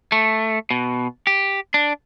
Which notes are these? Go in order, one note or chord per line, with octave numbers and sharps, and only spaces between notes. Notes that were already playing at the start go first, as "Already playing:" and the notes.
A3
B2
G4
D4